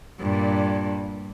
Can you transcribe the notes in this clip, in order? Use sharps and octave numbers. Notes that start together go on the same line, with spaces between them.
G2 A#2